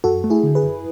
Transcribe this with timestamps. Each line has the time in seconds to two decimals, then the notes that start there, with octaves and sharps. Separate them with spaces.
0.04 F#2 F#4 A4
0.24 A3
0.30 E4 G#4
0.43 D3
0.55 G#4 B4
0.62 F#2